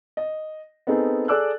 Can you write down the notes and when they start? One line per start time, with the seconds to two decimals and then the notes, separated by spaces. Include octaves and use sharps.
0.17 D#5
0.87 B3 C4 D#4 G#4 A4
1.28 G#4 A4 D5 D6 E6 F#6